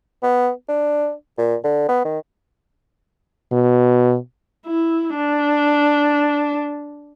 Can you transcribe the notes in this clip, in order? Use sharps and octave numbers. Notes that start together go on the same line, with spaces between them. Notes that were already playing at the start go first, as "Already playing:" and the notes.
B3
D4
A#2
D3
B3
D#3
B2
E4
D4